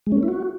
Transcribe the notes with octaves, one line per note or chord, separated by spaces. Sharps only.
G#3
C#4
A#3
E4
F#4